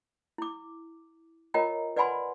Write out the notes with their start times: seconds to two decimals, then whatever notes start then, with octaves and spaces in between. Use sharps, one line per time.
0.38 E4 D6
1.54 F4 A#4 C#5 D#5 G5 A#5
1.96 B4 D5 F#5 G#5 B5 C6